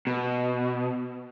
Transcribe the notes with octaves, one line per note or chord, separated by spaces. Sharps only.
B2